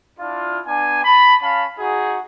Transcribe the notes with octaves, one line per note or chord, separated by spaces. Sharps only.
D4 E4 F4
B3 D4 G#5
A5 B5
C#4 F5 A5 B5
D#4 F#4 G#4